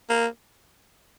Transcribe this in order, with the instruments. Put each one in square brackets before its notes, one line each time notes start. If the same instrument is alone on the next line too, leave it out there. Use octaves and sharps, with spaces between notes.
[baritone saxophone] A#3